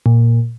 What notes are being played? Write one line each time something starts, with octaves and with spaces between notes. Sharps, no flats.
A#2